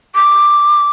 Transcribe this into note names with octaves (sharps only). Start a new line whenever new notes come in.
D6